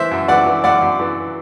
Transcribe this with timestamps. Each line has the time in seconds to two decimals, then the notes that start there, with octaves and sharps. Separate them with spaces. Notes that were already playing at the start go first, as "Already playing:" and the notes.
Already playing: E3 C5 E5
0.11 F#2
0.28 E3 D5 F#5
0.46 E3
0.64 F#2 D5 F#5
0.82 F#2
1.00 E3